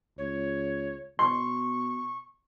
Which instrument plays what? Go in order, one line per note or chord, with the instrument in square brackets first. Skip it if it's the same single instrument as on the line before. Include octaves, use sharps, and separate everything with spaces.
[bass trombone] C#2 [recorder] C#5
[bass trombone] B2 [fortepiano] C6 [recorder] C#6